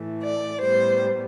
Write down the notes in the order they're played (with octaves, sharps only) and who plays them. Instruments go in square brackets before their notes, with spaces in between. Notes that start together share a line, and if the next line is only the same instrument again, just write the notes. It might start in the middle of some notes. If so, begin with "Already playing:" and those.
Already playing: [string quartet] A2 E3 A3
D5
A2 G3 B3 C5